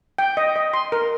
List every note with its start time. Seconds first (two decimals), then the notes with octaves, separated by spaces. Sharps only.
0.19 G5
0.37 D#5
0.56 D#5
0.74 C6
0.92 A#4